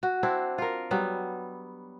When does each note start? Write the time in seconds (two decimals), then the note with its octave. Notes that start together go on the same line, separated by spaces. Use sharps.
0.03 F#4
0.23 C4 D4 E4
0.58 F4 A#4
0.91 F#3 G3 B3